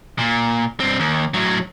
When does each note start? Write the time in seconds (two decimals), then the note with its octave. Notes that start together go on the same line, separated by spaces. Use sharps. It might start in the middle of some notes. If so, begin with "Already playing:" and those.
0.19 A#2
0.80 G2 C4
1.00 D#2
1.34 A2 F#3